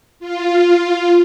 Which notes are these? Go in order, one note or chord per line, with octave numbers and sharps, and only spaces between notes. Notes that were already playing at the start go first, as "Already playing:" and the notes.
F4